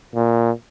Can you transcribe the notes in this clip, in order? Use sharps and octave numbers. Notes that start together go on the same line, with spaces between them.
A#2